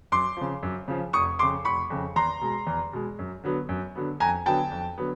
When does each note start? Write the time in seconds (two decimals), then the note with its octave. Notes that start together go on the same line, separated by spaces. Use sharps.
0.12 F#2 C6 D6
0.37 C#3 F3
0.63 F#2
0.88 C#3 F3
1.13 F1 C#6 D#6
1.39 F2 C#3 C6 D6
1.65 F1 B5 C#6
1.90 F2 C#3
2.16 E2 A#5 C6
2.41 B2 G#3
2.67 E2
2.93 B2 G#3
3.19 F#2
3.44 D3 F#3 B3
3.69 F#2
3.96 D3 F#3 B3
4.20 F2 G#5 A#5
4.46 D3 F#3 B3 G5 A5
4.71 F2
4.98 D3 F#3 B3